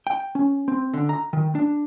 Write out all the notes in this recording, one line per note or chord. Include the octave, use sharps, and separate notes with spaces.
G5
C#4
C4
D3
A#5
D#3
D4